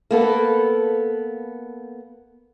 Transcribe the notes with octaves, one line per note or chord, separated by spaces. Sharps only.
A#3 B3 A4